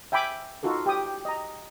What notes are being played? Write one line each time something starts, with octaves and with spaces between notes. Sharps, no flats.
E5 G5 G#5 B5 D6
D#4 F4 F#4 A4 A#4
G4 G5 D#6
D#5 A#5